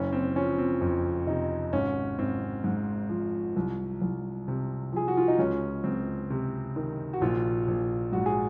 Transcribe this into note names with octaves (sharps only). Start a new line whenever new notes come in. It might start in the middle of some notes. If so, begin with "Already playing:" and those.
Already playing: F#1 C#4
C4
F3 C#4
C4
F2
C3 D#4
G#1 C#4
G#1 C4
G#2
F3
C2
C2
C3
F3 G#4
F#4
F4
D#4
C#2 C#4
C#2 C4
C3
D#3
F#4
A#1 F4
A#1
G#2 F#4
G#4